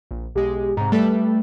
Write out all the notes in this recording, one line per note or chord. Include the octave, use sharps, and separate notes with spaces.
A#1
B1 G#3 G4
G#2 C3 A#5
G3 A3 A4 B4